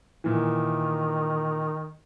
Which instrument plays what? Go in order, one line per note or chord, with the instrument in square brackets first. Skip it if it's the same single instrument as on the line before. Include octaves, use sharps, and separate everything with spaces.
[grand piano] A#2 E3 [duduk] D#3